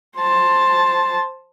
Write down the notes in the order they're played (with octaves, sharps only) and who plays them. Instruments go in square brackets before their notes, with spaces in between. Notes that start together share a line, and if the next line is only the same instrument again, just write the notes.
[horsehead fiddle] C5 A5